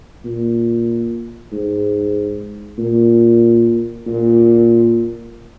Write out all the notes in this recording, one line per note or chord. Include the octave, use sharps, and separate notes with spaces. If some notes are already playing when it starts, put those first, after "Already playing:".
A#2
G#2
A#2
A#2